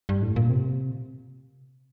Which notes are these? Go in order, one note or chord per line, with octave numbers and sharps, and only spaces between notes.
G2
A2
A#2
C3